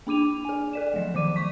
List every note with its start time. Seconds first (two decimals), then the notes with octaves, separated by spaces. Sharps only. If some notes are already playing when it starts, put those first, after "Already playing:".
0.07 A#3 D4 D6 D#7 F7
0.45 G#4 G#5
0.73 A4 D5 E7
0.94 F3 F#3 A3
1.15 D#3 F3 D6 D#7
1.36 C#6 D6 B6